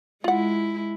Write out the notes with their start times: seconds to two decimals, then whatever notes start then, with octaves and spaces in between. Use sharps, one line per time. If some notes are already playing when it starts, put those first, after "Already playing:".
0.24 G#3 E4 F4 F#5